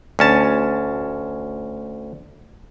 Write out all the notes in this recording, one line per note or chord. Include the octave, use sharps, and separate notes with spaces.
D2 C#4 A5